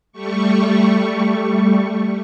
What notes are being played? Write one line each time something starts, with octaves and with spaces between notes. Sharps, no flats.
G3 A3 C#6